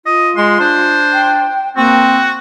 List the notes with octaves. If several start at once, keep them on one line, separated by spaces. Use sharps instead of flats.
F4 D#5
G#3 C6
D4 C5
G5
A#3 C4 F#4